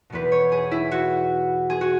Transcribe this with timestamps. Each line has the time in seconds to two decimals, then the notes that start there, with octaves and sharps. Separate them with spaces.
0.10 E2 B2 B3 B4
0.32 C#5
0.52 G#4
0.71 E4
0.91 F#4
1.70 G#4
1.81 F#4